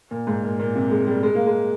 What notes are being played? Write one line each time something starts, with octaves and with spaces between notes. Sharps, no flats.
A#2
G#2
A#2
A#2
C3
G#3
G3
G#3
A#3
G#3